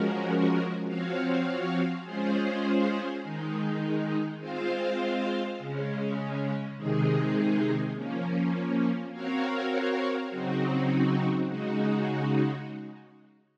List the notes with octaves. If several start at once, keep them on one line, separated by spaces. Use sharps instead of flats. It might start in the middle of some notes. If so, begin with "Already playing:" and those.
Already playing: F3 G#3 C#4 F#4 A#4
F3 C4 F#4 C#5 F5
G#3 C#4 F4 G#4 C5
D#3 G#3 D#4
G#3 C4 F4 C5 F5
C#3 G#3 C#4
C3 D#3 G#3 D#4 G#4
F3 A#3 C#4
C4 F#4 A#4 C#5 F5
C#3 F#3 C4 D#4 F#4
C#3 G#3 D#4 F#4